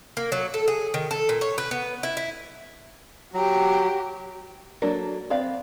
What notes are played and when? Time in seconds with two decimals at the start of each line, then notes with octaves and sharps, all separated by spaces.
0.17 A#3
0.32 F#3
0.54 A4
0.68 G#4
0.94 D#3
1.11 A4
1.29 A#2
1.41 C#5
1.58 B4
1.71 B3
2.03 E4
2.17 E4
3.34 F#3 F#4 G4
4.82 F#3 A#3 D4 A4 A#4
5.30 B3 C4 B4 D5 F5